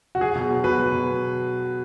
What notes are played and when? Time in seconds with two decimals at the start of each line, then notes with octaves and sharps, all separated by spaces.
0.15 F#4
0.21 F#3 G#4
0.35 B2
0.50 F#3
0.64 B2 B4
0.78 F#3
0.92 B2